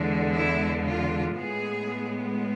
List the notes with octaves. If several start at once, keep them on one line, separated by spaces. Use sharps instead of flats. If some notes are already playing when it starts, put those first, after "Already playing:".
Already playing: E2 D3 G#3
E4
F4
A2 G#3 B3 G#4